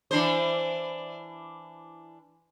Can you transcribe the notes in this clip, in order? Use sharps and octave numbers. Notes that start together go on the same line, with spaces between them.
E3 D4 C5